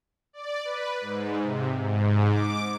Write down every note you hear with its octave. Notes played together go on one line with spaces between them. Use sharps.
D5
B4
G#2
C3
G#2
D6